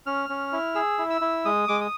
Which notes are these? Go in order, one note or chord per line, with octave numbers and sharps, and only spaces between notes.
C#4 F6
C#4
E4
G#4 E6
E4
E6
E4
G#3 D#6
G#3 D6
D#6